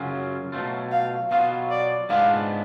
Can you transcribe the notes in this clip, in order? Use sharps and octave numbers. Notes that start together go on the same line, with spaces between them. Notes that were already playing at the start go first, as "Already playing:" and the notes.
Already playing: F#2 C#3 F#3 C#4 F4
B2 F#3 A3 F4
F5
B2 F#3 B3 F4 F5
D5
G#2 G#3 B3 D4 F4 F5